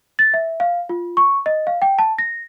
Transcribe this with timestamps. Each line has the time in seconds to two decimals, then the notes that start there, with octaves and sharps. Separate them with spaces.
0.19 A6
0.34 E5
0.60 F5
0.89 F4
1.17 C#6
1.46 D#5
1.67 F5
1.82 G5
1.99 A5
2.18 A#6